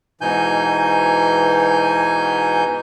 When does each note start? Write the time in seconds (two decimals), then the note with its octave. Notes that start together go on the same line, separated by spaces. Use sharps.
0.21 G#2 B2 E3 D#4 G#5 G6